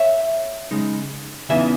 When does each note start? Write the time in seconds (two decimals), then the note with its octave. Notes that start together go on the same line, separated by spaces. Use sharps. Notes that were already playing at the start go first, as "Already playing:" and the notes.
Already playing: C#5 E5
0.71 C#3 G#3 D#4
1.49 E2 C#3 E3 B3 D#4 E5 G#5